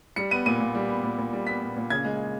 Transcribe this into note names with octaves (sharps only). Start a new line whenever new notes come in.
G3 C#7
B3 D#7
A#2 D#7
A#2
G3
B3
A#2
A#2
G3
B3 B6
A#2
A#2
C#3 G#6
G#3